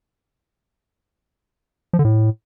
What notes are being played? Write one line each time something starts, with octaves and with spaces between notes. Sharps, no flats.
F3
D3
A2